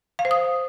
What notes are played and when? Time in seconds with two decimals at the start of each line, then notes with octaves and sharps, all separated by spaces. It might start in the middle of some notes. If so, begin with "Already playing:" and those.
0.19 F5
0.25 C5
0.31 D#6